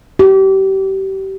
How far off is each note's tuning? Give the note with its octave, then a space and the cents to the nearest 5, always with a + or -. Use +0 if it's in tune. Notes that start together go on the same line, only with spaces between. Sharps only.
G4 -30